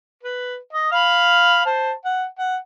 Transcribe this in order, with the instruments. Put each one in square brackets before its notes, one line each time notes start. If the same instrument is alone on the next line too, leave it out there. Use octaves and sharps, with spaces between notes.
[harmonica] B4
D#5
F5 B5 F6
C5 A5
F#5
F#5